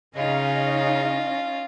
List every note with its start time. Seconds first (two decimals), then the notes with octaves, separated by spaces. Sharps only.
0.17 C#3 C#4 D#4 F4 D#5